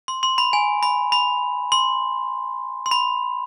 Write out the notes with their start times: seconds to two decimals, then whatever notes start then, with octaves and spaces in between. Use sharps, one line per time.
0.08 C6
0.23 C6
0.38 B5
0.53 G#5
0.83 B5
1.12 B5
1.72 C6
2.86 C6
2.91 B5